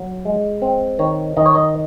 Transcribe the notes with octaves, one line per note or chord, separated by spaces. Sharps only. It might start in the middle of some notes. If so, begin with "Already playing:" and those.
Already playing: F#3
G#3
C4
D#3 C#5
D#3 D#5
C#5
D#5